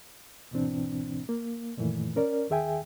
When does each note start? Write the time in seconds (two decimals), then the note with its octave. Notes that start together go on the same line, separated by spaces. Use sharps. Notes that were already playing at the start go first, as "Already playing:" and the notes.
0.51 D2 G#2 B2 E3 C4 D4
1.29 A#3
1.77 F#2 A#2 D#3 E3 A3
2.16 C#4 A#4 D5
2.50 D#2 D#3 G#4 E5 G5 G#5